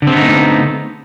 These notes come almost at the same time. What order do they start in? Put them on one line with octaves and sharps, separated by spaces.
D3 C4 B3 D#4 A3